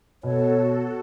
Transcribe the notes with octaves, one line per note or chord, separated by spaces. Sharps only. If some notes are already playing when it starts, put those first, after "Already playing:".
B2 F#4 A4 C#5